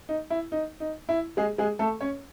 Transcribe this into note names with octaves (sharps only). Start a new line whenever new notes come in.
D#4
E4
D#4
D#4
E4
G#3 G#4
G#3 G#4
A3 A4
C#4 C#5